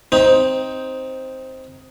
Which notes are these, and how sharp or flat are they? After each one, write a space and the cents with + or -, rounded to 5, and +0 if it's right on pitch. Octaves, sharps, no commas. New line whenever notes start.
C4 +0 D#4 +10